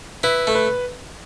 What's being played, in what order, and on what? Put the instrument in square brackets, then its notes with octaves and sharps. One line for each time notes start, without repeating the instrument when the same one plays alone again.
[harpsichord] E4 [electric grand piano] B4
[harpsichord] A3
[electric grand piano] B4